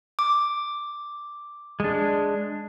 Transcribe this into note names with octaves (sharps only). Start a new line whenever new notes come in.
D6
G#3 D4